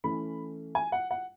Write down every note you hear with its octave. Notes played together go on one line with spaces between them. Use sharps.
E3 A3 C#4 B5
G#5
F#5
F#5